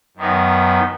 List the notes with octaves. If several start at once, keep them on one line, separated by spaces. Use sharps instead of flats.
F#2 D#3 B3 D#4